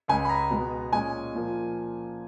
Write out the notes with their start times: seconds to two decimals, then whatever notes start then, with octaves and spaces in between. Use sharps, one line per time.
0.08 C#2 C#3 G#3 G#5
0.25 B5
0.29 A#5
0.50 B2 G#3 B3
0.92 A#2 G#3 C#4 G#5
1.34 A#2 F3 A#3